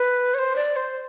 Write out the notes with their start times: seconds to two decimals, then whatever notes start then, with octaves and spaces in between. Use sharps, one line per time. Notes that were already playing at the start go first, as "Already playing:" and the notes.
Already playing: B4
0.34 C#5
0.38 C5
0.56 D5
0.76 C5